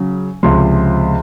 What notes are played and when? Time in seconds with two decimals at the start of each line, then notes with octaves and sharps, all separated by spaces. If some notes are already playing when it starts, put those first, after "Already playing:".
Already playing: C#3 F#3
0.43 C#2 C3 F3 C6